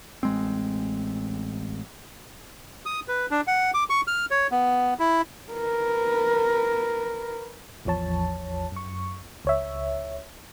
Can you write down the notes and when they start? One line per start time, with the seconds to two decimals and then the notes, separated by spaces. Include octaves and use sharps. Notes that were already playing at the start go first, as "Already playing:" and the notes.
0.23 A1 G#3 C4
2.86 D#6
3.08 B4
3.31 D4
3.47 F#5
3.74 D6
3.90 C#6
4.07 F6
4.31 C#5
4.51 B3
4.99 E4
5.52 A#4 B4
7.85 A1 E2 F3 C#5 A5
8.72 F#2 C#6
9.45 C#2 C#5 E5